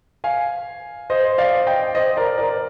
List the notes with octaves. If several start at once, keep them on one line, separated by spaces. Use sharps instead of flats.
F5 G#5
C5 D#5
D5 F5
D#5 G5
C5 D#5
A#4 D5
A#4 D5